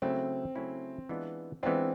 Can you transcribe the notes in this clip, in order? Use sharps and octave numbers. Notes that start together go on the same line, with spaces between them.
C#3 F#3 A3 C4 C#4 E4
C#3 F#3 A3 C#4 E4
E3 G#3 B3 D4 F4
E3 G#3 B3 C4 D4 F4